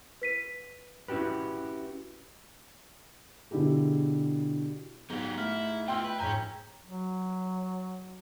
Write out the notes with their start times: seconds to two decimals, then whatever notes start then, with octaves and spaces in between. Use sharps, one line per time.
0.22 B4 B6 D#7
1.08 C#4 E4 F#4 G4 B4
3.51 B2 D3 E4 G4 G#4
5.10 G#2 F#3 B3 G4
5.37 A3 E4 E5 F6
5.88 B3 F4 G5 C6 E6
6.04 B4
6.20 F2 G#2 C#5 G#5 A#5 G6 B6
6.86 F#3